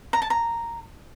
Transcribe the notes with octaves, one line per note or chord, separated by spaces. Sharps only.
A#5
A5
A#5